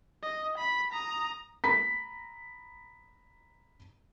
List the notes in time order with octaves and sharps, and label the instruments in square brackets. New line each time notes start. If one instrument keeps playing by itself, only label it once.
[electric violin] D#5
B5
A#5 D#6
[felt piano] A#5 B5 B6